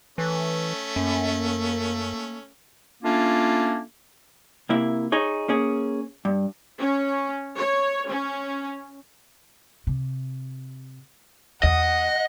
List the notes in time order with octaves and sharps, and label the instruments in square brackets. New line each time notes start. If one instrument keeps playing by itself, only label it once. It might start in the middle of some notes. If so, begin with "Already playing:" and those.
[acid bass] E3 [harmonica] A3 C#4
[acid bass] F#2 [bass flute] A#3
[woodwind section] A3 A#3 C#4 D4 F4
[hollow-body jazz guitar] C3 A#3 E4 E5
D#4 G#4 C#5
A#3 C#4 G#4
G2
[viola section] C#4
C#5
C#4
[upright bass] C3
[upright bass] E2 [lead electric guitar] D#5 [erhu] F#5